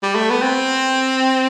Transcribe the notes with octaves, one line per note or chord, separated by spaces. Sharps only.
G3
A3
B3
C4